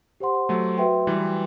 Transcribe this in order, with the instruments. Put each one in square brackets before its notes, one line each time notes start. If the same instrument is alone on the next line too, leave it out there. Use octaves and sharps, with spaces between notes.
[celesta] G4 C5 F#5 C6
[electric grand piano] F#3 A3
[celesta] F#4 B4 E5 G5 C6
[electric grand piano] E3 G3